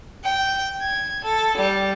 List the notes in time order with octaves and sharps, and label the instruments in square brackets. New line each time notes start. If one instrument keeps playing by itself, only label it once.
[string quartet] G5
G#6
A4
G3